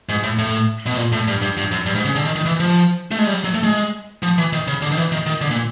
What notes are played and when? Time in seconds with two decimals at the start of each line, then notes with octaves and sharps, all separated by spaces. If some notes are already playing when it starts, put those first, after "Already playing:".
0.09 G#2
0.23 A2
0.38 A2
0.86 B2
0.97 A#2
1.12 A2
1.28 G2
1.42 G2
1.57 G2
1.71 F#2
1.86 G2
1.95 G#2
2.05 C#3
2.16 D3
2.25 D#3
2.36 D#3
2.46 E3
2.60 F3
3.11 A3
3.19 G#3
3.26 G3
3.34 F#3
3.44 F#3
3.54 A3
3.63 G#3
4.23 F3
4.38 E3
4.53 D#3
4.67 C#3
4.82 D3
4.92 D#3
4.97 E3
5.12 D#3
5.26 D#3
5.41 D3
5.51 A#2